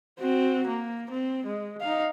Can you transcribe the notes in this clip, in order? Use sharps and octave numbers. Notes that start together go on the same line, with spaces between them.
C4 F#4
A#3
C4
G#3
D#4 F5